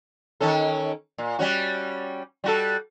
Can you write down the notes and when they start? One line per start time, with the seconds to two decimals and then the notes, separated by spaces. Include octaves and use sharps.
0.40 D#3 C#4 A4
1.18 A#2
1.39 G3 C#4 F#4
2.44 G3 F#4 A4